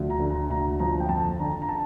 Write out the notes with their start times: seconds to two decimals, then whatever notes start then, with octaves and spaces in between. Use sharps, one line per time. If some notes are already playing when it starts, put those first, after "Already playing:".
Already playing: D2 F3
0.10 A#5
0.20 D3
0.30 A#5
0.50 D2 A#5
0.79 F3 A#5
1.00 G5
1.09 F2 A5
1.39 D3 A#5
1.62 A#5
1.69 A5